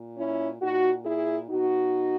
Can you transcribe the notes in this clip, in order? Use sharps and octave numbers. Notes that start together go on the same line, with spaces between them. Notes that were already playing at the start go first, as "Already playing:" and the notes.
Already playing: A#2
C#4 E4
A#2 D#4 F#4
E4 G#4
B2 D#4 F#4